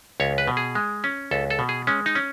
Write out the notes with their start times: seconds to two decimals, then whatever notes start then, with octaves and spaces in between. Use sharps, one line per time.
0.20 C#2 C#5
0.38 B4
0.47 B2
0.57 G#4
0.75 G#3
1.04 C#4
1.31 C#2 A4
1.50 A4
1.59 B2
1.69 G#4
1.87 G#3 C#4
2.06 D#4
2.15 C#4